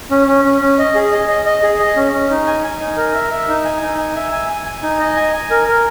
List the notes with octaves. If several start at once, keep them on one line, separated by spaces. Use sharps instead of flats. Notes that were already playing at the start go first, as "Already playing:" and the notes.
C#4
C#4
C#4
C#4
D#5
G#4
D#5
D#5
D#5
G#4
D#5
C#4
C#4
D#4
G#5
G#5
D#4
A#4
E5
E5
D#4
G#5
D#4
G#5
E5
G#5
G#5
G#5
D#4
D#5
G#5
G#5
A#4
A#4